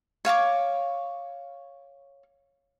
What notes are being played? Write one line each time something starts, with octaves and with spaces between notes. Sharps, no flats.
C#5 F5 C#6 D6